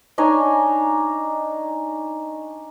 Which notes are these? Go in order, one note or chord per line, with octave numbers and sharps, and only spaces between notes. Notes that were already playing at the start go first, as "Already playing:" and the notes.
D4 D#4 C#5 G#5